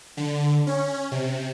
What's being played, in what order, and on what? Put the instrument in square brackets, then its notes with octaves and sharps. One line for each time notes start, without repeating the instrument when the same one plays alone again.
[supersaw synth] D3
C#4
C3